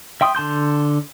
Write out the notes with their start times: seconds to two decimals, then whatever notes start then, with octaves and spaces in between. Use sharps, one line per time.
0.21 E5 G5 C6 D#6
0.35 D3 A5 C6 G6